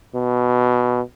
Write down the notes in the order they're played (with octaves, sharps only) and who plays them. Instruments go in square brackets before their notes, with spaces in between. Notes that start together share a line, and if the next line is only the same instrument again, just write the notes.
[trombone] B2